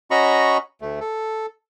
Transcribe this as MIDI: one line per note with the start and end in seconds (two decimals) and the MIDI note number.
0.11 0.58 61
0.11 0.58 66
0.11 0.58 75
0.11 0.58 82
0.11 0.58 83
0.11 0.58 85
0.82 0.99 38
0.82 0.99 57
1.00 1.46 69